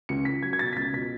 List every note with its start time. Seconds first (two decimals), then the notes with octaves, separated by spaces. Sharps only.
0.09 C#2 C#7
0.25 C#2 B6
0.43 F#3 G#6
0.53 G#6
0.59 B2 A6
0.73 B6
0.76 C#2 A6
0.93 B2 B6